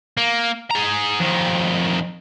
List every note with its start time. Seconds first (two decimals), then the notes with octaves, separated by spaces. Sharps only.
0.17 A#3
0.71 G#4 A#5
1.20 F2 D#3